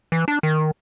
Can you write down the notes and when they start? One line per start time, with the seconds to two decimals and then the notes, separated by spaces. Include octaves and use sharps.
0.12 E3
0.28 D4
0.43 D#3